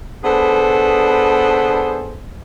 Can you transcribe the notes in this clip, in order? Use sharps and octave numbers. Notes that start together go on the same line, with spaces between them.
B3 D4 G#4 A4 B4 C5